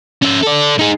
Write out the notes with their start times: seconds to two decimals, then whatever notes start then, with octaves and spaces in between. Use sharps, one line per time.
0.22 C#4 E5
0.43 A4 D5
0.79 D#4 G#4